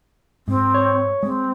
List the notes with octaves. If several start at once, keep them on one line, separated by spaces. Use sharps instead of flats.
G#2 C4
C#5
G#3 C4